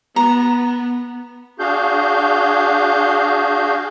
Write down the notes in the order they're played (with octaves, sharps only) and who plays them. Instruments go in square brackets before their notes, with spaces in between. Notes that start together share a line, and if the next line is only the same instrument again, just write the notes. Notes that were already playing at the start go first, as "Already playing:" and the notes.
[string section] B3 [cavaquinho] A#5
[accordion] D4 F#4 G#4 F5 G6